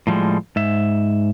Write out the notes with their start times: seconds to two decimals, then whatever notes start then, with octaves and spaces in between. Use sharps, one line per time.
0.07 A2 F3 G3 G#3
0.56 G#2 E5